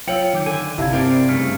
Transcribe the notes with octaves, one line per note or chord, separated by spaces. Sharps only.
F#3 F4 C#5 G5 E6 C#7 F#7
D#3 D6 G6
D3 D#3 A4 G#5
G1 C3 E4 E5 F5 A5 G#6
C4 E4 A#4 C5 D5
G2 C#3 A3 F6